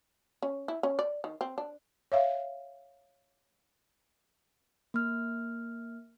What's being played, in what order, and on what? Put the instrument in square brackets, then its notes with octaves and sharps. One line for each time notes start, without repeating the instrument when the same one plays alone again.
[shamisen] C#4
E4
C#4
D5
D#3
C4
D4
[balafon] C#5 E5 F5
[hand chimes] A#3 F6